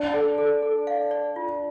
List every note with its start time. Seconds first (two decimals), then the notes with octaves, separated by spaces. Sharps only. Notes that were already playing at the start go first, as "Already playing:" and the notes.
Already playing: D4 D5
0.14 A4
0.38 A4
0.62 A4
0.87 F5
1.11 D5
1.36 F4